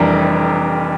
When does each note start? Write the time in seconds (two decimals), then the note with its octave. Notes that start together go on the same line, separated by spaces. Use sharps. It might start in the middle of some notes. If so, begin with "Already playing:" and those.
Already playing: F1 F2 E3 G3 D4 A#4